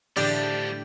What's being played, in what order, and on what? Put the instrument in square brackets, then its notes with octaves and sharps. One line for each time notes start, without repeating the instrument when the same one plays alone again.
[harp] A2 D3 [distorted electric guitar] F3 G3 [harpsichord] D4 [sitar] G4